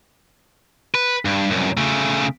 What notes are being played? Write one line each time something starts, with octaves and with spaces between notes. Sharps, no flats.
B4
G2
C2 F#2
C#3 A3